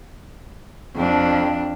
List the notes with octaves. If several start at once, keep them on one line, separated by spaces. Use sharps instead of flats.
F2 D4